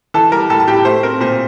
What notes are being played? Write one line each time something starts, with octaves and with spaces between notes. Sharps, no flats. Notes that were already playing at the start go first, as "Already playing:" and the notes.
E3 A4 A5
G3 A#4 A#5
A2 A4 A5
A5
A2 G4 G5
A3 C5
C4 A#4
A#2 C5